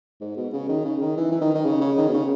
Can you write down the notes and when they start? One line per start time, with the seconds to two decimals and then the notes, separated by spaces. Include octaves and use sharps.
0.21 G#2
0.37 B2
0.53 C#3
0.69 D#3
0.85 C#3
1.01 D#3
1.17 E3
1.32 E3
1.41 D#3
1.55 D#3
1.65 C#3
1.81 C#3
1.98 D#3
2.08 B2
2.14 C#3